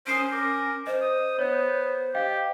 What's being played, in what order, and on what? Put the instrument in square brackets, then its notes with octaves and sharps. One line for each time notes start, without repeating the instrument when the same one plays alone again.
[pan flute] C#4 [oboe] C5 [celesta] D#6 C7 D7
[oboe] A#4 [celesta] D6
[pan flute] C5 [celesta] D#5
[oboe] D#6
[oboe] B3 [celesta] C#5
[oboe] G4 [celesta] D#5 F5 G5